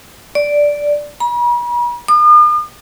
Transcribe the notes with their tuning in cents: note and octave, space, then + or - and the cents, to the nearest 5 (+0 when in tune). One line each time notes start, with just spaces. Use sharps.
D5 -5
B5 -45
D#6 -45